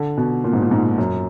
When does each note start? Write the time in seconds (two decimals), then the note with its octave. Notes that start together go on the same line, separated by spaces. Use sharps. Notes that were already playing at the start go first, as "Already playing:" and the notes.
Already playing: D3
0.17 B2
0.44 A#2
0.53 G#2
0.62 A#2
0.71 G#2
0.98 F#2